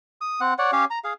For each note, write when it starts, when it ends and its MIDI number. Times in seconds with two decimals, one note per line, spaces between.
0.21 0.40 87
0.41 0.54 60
0.41 0.54 78
0.59 0.71 73
0.59 0.71 74
0.59 0.71 78
0.72 0.85 61
0.72 0.85 67
0.72 0.85 73
0.72 0.85 77
0.90 0.99 82
1.04 1.13 68
1.04 1.13 77